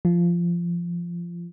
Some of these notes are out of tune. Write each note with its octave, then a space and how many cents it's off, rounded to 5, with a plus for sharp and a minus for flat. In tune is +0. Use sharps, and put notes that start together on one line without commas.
F3 -15